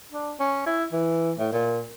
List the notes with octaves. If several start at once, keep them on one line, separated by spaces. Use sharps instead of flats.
D4
C#4
E4
E3
A2
A#2